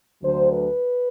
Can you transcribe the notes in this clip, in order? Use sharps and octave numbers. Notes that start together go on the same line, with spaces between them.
D2 D3 F#3 C5
B4